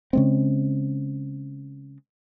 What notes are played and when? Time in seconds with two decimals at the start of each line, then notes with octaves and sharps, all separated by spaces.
0.13 C#3 G#3 C4